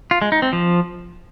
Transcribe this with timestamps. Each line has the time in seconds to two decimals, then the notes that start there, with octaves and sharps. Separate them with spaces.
0.11 F4
0.22 G#3
0.32 D#4
0.42 C4
0.53 F3